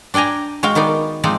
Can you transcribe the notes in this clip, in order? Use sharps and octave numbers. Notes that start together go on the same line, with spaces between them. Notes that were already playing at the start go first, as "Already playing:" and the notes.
D4 D5 G5 G#5 A#5
G#3 F#4 F5 G5
D#3 B3 D#4 D5
F3 G#3 C4 D#4 D5